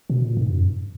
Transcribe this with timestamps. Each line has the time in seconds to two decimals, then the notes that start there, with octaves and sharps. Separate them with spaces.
0.10 B2
0.24 A#2
0.37 G#2
0.50 F#2